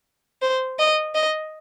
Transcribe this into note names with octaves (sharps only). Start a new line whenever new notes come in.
C5
D#5
D#5